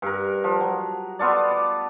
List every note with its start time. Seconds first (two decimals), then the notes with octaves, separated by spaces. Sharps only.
0.02 G2 A#4
0.44 F3
0.60 F#3
1.19 B3 F4 A4 D5
1.51 D6